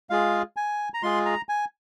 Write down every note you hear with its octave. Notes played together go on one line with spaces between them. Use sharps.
G#3 F4 G#4 F5
G#5
A#5
G#3 F4 G#4 C6
A#5
G#5